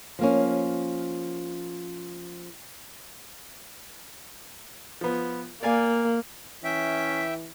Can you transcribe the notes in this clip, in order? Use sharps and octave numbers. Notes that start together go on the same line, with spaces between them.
F3 A#3 C#4
F3 B3
A#3 D5 F5 G#5
E3 C#4 E5 G5 B6